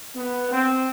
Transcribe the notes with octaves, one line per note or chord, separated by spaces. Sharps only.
B3
C4